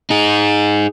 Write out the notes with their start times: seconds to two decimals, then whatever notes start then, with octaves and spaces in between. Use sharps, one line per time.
0.10 D#4 G#4